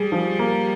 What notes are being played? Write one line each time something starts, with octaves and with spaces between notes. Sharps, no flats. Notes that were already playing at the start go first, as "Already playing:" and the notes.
Already playing: G3 G#4
F3
A#3